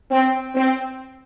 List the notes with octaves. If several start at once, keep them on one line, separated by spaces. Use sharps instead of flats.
C4
C4